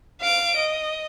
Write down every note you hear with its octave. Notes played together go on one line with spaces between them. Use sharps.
F5 D7
D#5